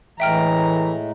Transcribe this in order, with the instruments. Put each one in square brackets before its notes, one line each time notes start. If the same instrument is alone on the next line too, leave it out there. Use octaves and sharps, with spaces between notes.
[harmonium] A2 G#3 A3 [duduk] E3 [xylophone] E5 G5 F6 [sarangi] A#5